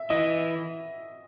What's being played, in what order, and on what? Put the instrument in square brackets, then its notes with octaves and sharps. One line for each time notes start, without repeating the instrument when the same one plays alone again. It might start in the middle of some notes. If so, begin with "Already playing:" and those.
Already playing: [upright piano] E5
[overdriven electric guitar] E3 [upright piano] D#5